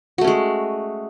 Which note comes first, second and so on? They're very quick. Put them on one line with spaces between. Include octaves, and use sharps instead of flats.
F#4 A3 C#4 G#3